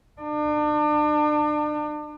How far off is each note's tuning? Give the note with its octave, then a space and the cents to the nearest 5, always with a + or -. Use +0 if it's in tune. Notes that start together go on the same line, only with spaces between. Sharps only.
D4 +35